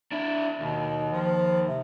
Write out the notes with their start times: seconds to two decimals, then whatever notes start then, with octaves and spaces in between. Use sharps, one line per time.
0.12 D4 E4
0.60 D#2 B2
1.12 F3
1.68 C3